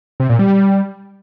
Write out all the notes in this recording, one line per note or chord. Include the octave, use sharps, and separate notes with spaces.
C3
A#2
G3